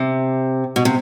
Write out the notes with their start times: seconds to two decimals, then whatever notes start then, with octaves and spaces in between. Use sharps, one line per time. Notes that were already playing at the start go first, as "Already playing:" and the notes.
Already playing: C3
0.76 B2
0.85 C3